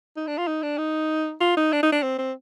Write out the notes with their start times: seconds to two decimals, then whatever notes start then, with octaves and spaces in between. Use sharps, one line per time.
0.17 D#4
0.27 D4
0.38 F4
0.48 D#4
0.63 D4
0.78 D#4
1.41 F4
1.57 D#4
1.73 D4
1.83 D#4
1.93 D4
2.03 C4
2.19 C4